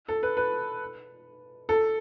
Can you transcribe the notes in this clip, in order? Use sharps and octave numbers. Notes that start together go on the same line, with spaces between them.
A4
B4
B4
A4